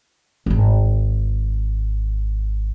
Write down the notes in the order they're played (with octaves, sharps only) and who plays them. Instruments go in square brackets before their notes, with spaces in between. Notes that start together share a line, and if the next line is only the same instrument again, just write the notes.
[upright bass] D#1 G#1